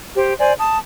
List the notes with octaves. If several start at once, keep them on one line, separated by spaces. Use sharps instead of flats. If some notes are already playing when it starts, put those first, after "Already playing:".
G4 C5
C5 D5 G#5
A5 D#6